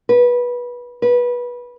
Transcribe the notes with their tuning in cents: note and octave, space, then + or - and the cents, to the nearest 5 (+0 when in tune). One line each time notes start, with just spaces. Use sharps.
B4 -20
B4 -20